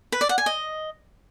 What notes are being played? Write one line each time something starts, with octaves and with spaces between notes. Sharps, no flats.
B4
D5
F#5
G#5
D#5